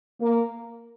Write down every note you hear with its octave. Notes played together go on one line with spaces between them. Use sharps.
A#3